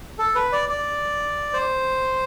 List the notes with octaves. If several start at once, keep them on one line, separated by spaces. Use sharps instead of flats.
A4
B4
D5
D5
C5